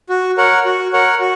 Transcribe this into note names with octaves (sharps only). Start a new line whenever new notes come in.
F#4
A#4 C#5 F#5
F#4
A#4 C#5 F#5
F#4